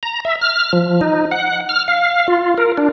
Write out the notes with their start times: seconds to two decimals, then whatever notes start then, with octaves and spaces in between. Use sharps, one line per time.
0.03 A#5
0.25 E5
0.41 F6
0.73 F3
1.01 D#4
1.31 F#5
1.69 F6
1.88 F5
2.28 F4
2.58 A#4
2.77 D4